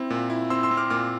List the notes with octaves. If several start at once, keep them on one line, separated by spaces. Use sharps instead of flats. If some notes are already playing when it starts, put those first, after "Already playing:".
Already playing: C4 E4
A#2
E4
C4 C6 E6
C6 E6
C4
D6 F6
A#2 D6 F6